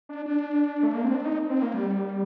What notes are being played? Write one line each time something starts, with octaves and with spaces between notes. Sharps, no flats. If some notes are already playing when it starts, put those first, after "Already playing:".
D4
D4
A3
A#3
C4
D4
D#4
C4
A#3
G3